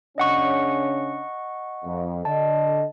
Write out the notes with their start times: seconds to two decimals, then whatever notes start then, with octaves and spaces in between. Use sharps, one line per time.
0.18 C#3 C#4 D4 D#5 F#5 C#6
1.84 F2
2.25 D3 D#5 A5